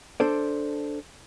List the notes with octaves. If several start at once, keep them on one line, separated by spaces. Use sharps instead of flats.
D4 A4 C5 D5